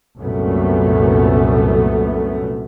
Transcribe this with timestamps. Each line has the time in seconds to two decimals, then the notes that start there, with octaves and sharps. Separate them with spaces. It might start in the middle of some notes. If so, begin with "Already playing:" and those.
0.18 C2 F#2 A#2 A3 B3